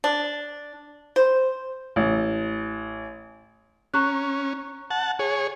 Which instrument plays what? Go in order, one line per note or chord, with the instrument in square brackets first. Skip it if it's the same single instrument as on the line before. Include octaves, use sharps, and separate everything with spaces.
[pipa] D4
C5
[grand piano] A1
[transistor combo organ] C#4 [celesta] A#5 C#6 F#6
[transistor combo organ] F#5 A5
G#4 C#5